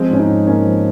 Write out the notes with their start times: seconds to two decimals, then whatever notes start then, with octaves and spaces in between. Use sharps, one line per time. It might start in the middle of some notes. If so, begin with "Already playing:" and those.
Already playing: F3 G#3 C4
0.10 G#2 C#4
0.19 C4 D#4
0.28 G#2
0.47 G#2 A#3 C#4
0.66 F3